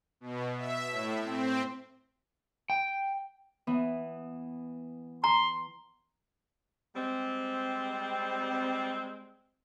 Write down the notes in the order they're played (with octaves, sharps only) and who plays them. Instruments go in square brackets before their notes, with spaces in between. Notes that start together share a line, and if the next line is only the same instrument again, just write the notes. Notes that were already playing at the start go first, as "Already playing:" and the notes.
[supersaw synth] B2
E5
A2
C4
[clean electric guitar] G5
[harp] E3 B3
[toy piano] A#5 [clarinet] C6
[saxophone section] G3 G#3 C4